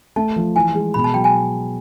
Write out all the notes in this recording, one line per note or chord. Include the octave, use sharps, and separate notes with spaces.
A3 A5
F3
E3 G#5
G#3
B2 B5
A5
F#3 G5
G#5